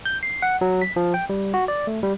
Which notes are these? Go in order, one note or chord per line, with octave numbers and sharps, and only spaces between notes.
G6
C7
F#5
F#3
B6
F3
G5
G3
F#4
D5
A3
G3